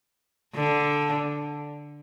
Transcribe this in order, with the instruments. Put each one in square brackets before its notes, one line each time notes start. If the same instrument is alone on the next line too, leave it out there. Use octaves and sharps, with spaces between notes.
[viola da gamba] D3